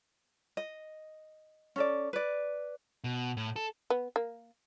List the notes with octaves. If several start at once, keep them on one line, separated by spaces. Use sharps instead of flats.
D#5
C#4 A4 D5
B4 D5
B2
A2
A4
B3
A#3